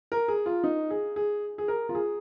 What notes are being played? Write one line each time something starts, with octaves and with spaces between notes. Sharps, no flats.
A#4
G#4
F4
D#4
G#4
G#4
G#4
A#4
F4
G#4